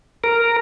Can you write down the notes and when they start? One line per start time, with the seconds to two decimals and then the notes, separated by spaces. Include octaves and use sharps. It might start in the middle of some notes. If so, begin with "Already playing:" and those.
0.24 A#4